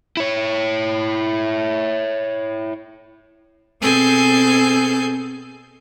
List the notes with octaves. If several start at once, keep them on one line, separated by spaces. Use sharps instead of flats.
E4 C#5
B2 C4 G#4 A4 G#5 G6